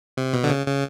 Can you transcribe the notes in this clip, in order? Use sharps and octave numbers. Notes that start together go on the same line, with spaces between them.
C3
B2
D3
C#3
C#3